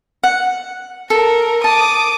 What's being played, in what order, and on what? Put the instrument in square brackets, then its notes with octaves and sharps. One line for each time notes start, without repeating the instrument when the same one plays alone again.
[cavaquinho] F#5
[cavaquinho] A4 [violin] A#4
[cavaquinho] A5 [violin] D6 D#6